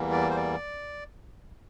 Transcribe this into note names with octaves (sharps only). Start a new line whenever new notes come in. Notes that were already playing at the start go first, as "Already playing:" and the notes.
Already playing: E2 E3 G3 A#3
D5
C5
D5